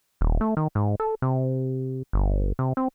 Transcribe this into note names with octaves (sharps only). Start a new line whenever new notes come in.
D#1
A3
D#3
G#2
A4
C3
G1
C3
C4